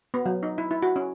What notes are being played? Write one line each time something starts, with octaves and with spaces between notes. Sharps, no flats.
B3
F#3
D#4
E4
E4
F#4
C#4